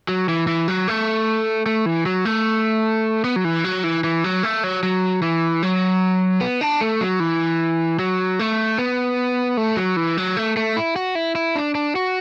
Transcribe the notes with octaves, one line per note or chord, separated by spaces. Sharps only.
F#3
E3
E3
F#3
A3
A3
E3
F#3
A3
B3
F#3
E3
F#3
E3
E3
F#3
A3
F#3
F#3
E3
F#3
B3
D4
A3
F#3
E3
F#3
A3
B3
A3
F#3
E3
F#3
A3
A3
E4
F#4
E4
E4
D4
D4
F#4